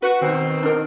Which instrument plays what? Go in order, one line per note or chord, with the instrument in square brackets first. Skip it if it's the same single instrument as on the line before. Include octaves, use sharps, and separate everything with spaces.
[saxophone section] F#4 [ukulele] B4
[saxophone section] B2 C4 [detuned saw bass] D#3
[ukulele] D4 A#4